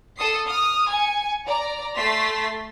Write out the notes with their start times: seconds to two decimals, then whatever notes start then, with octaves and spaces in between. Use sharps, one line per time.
0.17 A4 D#6 C7
0.48 D#6 F6
0.91 G#5 C#7
1.47 D5 A#5
1.96 A3 C6 A6 B6 C7